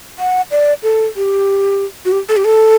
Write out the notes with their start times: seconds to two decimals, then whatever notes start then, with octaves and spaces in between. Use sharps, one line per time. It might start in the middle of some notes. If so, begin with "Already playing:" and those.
0.19 F#5
0.51 D5
0.83 A4
1.16 G4
2.05 F#4
2.12 G4
2.29 A4
2.37 G4
2.45 A4